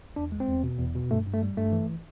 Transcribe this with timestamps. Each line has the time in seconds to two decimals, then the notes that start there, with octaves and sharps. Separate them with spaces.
0.16 E2 D4
0.32 G#3
0.40 C4
0.47 E2
0.64 B2
0.79 E2
0.95 B2
1.11 G2 A3
1.26 G2
1.33 A3
1.42 G3
1.57 G2 A3
1.72 E3